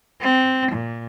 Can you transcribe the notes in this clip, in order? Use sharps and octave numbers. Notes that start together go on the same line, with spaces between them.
C4
A#2